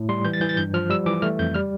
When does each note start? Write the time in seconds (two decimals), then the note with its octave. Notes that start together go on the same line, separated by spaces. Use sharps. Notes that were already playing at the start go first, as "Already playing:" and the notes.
Already playing: A2
0.09 G3 C6
0.25 E3 G6
0.33 A6
0.41 E3 G6
0.49 A6
0.57 G2 G6
0.74 F3 F6
0.90 G3 E6
1.06 E3 D6
1.22 A3 F6
1.39 F2 G6
1.54 G3 F6